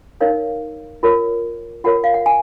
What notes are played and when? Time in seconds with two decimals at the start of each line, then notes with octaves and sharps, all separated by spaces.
0.21 D#4 A#4 C#5 F5
1.03 F4 A#4 C#5
1.84 F4 A#4 C#5 F#5
2.04 F5
2.14 F#5
2.26 G#5